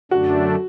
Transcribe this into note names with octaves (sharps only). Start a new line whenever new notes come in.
F#2 D3 A3 D4 F#4